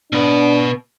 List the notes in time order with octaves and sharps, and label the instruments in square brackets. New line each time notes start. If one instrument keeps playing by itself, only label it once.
[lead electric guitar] B2 B4 [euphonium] D4